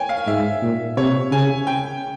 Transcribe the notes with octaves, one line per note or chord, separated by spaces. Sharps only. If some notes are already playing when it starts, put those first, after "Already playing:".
Already playing: C#5 G5 G#5
F5
G#2 E5
A#2
C3 C#5
C#3 G#5
G5